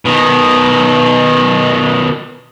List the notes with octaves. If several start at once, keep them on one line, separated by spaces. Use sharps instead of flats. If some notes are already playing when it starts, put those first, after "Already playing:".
B2 D#3